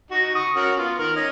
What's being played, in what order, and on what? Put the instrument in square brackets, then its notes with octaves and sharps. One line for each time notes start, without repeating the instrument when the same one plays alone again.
[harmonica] D#4 F#4
C#6 D#6
C#4 F#4 A#4
B3 F4
D#3 A#4
C#4 D#5